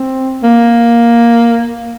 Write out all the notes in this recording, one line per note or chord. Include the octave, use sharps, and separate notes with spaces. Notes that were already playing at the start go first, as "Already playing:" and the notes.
Already playing: C4
A#3